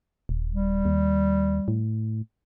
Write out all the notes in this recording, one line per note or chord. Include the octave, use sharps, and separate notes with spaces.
D#1
G3
D#2
A2